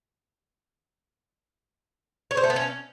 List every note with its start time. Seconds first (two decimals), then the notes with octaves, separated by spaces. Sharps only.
2.31 C#5
2.37 C5
2.43 A3
2.50 B3
2.56 C#4